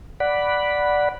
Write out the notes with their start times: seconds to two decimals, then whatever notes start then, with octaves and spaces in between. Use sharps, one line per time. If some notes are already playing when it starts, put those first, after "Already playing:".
0.20 D5 F#5 B5